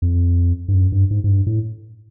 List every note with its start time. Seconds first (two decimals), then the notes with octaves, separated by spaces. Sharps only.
0.02 F2
0.68 G2
0.74 F#2
0.92 G2
1.11 G#2
1.24 G#2
1.28 G2
1.46 A2